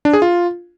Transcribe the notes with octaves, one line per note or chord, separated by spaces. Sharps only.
D4
G#4
F4